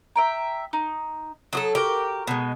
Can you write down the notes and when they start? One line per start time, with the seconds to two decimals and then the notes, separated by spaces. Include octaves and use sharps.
0.16 E5 G5 A#5
0.73 D#4
1.53 F#3 F#4 A4 A#5 D#6
1.75 F#4 G4 A#4 G5
2.27 B2 G#3